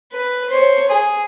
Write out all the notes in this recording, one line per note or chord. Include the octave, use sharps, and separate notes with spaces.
B4
C5 C#5
G#4